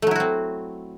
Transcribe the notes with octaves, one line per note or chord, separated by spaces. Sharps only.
F#3 A3 C4 E4 F#4